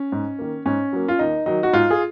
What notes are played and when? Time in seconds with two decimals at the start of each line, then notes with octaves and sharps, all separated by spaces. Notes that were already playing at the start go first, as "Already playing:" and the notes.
Already playing: C#4
0.12 G#2
0.39 D#3 A#3
0.66 G#2 C#4
0.93 F#3 A#3
1.08 F4
1.19 D#2 D#4
1.46 D#3 F#3 D#4
1.63 F#4
1.73 G#2 F4
1.91 G#4